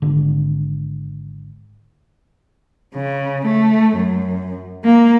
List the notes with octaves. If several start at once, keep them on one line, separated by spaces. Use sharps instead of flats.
G#1 D3
C#3
A3
F#2
A#3